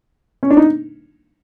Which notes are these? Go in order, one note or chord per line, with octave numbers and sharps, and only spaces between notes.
C#4
D4
D#4